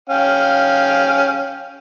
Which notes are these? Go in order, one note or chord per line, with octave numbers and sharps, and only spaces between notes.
C#4 F5 G5